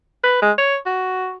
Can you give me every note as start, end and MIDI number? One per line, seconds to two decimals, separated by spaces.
0.24 0.41 71
0.42 0.52 56
0.58 0.77 73
0.86 1.34 66